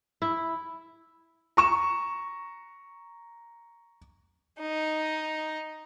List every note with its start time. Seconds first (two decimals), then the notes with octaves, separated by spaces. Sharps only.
0.22 E4
1.57 A#5 C#6 E7
4.60 D#4